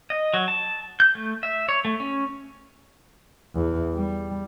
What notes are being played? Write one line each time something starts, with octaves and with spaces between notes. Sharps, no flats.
D#5
F#3
A5
G6
A3
E5
C#5
A3
C#4
E2
G3